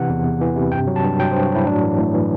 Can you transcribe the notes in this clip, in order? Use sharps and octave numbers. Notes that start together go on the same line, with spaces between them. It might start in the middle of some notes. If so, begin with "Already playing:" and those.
Already playing: C3 E3 F#5
E2
E2
E3
C3
G2 G5
F#3
A5
G2
F#3 G5
C5
G2
F#4
F#3 E4
A2 D4
E3
A2
E3